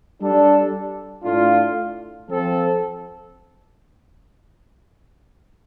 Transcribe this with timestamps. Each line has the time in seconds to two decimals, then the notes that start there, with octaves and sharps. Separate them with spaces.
0.20 G3 D4 A4
1.24 A2 A3 D4 F4
2.28 F3 C4 A4